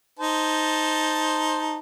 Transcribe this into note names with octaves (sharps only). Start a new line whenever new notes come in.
D#4 C5 A5